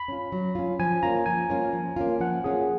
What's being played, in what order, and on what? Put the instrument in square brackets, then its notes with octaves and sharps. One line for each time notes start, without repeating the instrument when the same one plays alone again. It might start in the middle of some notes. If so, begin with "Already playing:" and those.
Already playing: [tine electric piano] B5
[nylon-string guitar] C#4 F4
F#3
C#4 F4
[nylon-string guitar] F3 [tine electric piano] G#5
[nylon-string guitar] A#3 C#4 F4 [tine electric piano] A#5
[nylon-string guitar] F3 [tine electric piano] G#5
[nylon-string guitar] A#3 C#4 F4
F3
A#3 C#4 F4
[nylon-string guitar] F3 [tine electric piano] F#5
[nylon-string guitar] A#3 C#4 F4 [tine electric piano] G#4